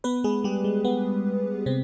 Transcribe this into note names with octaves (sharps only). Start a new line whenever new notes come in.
B3 B4
G#3 G#4
G3 G4
G#3
B3
C3 C4